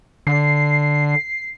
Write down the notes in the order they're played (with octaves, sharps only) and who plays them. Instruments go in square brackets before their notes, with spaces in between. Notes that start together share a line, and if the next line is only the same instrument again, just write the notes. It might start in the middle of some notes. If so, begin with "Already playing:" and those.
[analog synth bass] D3 [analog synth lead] C7